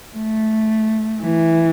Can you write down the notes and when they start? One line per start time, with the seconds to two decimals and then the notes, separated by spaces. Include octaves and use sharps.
0.16 A3
1.22 E3